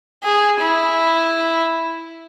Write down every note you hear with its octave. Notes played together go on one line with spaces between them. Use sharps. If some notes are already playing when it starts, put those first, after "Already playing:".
G#4
E4